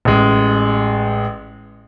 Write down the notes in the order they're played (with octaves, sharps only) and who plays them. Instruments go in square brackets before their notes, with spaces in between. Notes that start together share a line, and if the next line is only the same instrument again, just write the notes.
[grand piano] A1 G#3